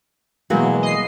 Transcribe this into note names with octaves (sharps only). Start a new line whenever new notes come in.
B2 E3 F#3 G#3 A#3
D#5 C7